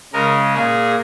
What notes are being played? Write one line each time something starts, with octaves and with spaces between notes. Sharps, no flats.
C#3 G#3 A#4
A#2 A#3 G#4